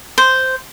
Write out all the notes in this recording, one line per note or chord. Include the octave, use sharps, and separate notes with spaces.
C5